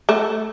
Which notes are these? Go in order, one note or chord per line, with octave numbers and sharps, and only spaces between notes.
A3